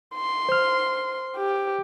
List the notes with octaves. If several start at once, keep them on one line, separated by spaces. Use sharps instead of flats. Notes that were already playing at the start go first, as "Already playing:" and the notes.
C6
C5 F6
G4